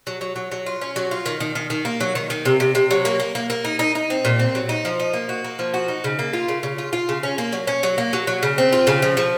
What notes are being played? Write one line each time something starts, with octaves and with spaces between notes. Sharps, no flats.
F#3
F#3
F#3
F#3
F4
C#4
F#3
F4
D#3
D#3
D#3
D#3
A#3
F#3
D#3
D#3
C3
C3
C3
F#3
A#3
A#3
A#3
A#3
D#4
D#4
D#4
C4
A#2
C4
F#3
D#4
F3
D#4
A#3
F#4
A#3
F3
F#4
D#4
C#3
A#3
F4
C#3
C#3
F4
F4
C#3
C#4
A#3
F#3
C#4
F#3
A#3
F#3
F#3
C#3
C4
F4
C#3
F3
F3